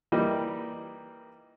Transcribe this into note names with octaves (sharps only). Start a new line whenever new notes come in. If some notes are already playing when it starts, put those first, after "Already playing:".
E3 G3 A#3 D#4 G4